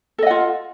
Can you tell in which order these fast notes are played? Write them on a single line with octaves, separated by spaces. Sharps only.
A4 D#5 F#5 F4